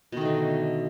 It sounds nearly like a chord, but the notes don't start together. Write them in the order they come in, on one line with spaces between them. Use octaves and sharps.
B2 D#3 A3 D3